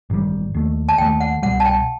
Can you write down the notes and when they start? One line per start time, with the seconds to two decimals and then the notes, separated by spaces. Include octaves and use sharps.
0.10 A1 G2 D#3 G3
0.54 D#2 D#3 A3
0.89 A5
0.98 D#2 D#3 A3 G5
1.20 F#5
1.42 C2 B2 G3 F#5
1.60 A5
1.66 G5